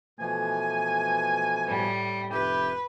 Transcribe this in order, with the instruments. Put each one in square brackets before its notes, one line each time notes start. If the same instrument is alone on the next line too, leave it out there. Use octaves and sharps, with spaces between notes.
[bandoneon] B2 E3 F3 [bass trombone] A3 [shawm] G#5
[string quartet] A2 G3
[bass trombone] F1 [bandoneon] E4 [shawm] G4 [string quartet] B4